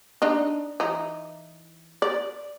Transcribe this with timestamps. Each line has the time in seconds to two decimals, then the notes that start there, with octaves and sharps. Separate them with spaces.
0.22 D4 D#4
0.80 E3 D#4
2.02 D5